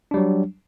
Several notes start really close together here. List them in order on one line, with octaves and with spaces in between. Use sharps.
D4 G3 F#3